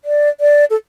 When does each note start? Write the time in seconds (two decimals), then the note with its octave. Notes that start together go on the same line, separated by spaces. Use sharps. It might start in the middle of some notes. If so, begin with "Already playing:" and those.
0.05 D5
0.40 D5
0.70 A4